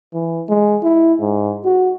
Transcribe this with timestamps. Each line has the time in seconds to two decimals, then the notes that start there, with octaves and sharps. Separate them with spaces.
0.14 E3
0.49 G#3
0.83 E4
1.20 G#2
1.64 F#4